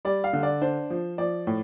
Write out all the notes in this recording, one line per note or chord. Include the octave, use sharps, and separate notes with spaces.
G3 D5
F5
D3
D5
D4 C5
F3
F3 D5
A2